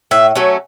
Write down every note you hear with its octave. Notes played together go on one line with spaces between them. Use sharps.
A2 E5
F#3 A3 C#4